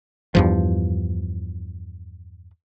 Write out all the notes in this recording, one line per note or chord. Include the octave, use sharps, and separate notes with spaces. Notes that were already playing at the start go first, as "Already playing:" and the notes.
E2 G2 F3